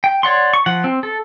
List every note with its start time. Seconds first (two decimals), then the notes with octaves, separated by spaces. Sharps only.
0.04 G5
0.23 C#5 D5 F#5 C6
0.54 C#6
0.66 F3 F#5
0.84 C4
1.03 A4